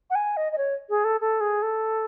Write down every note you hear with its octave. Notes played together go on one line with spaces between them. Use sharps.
F#5
G#5
D#5
D#5
C#5
G#4
A4
A4
G#4
A4